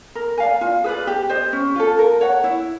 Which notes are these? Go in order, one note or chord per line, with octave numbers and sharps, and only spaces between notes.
A#4
D5 F5 G#5
F4
G#4 B4 D5
G4
C5 D#5
C#4
F4 A4
A#4
C#5 F#5
E4